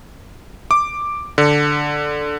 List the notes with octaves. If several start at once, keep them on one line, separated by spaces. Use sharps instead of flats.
D6
D3